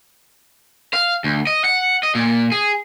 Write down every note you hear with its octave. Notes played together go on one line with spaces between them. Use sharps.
F5
D2
D#5
F#5
D#5
A#2
G#4